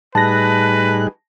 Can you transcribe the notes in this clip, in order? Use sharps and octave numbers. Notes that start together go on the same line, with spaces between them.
A2 G3 D#4 G#4 B4 A5 F#6 A#6